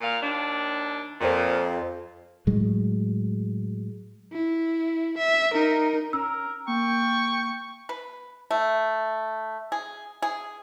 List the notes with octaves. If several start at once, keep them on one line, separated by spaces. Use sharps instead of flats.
A#2 F5
D#2 D4
F2 A#2 F3
A2 F#3 G#3
E4
E5
D#4 A#4
C#4 A#4 E6
A#3 G5 C#6
B4
A3
G#4
G#4